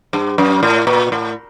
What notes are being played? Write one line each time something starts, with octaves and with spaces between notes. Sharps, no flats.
G2
F#2
A2
A#2
A2